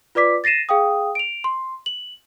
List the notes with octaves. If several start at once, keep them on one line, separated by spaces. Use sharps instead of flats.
F4 B4 D5 D6 B6
A6 A#6 C7 D#7 E7
G#4 F5 G5 D#6
D7 F7
C6
F#7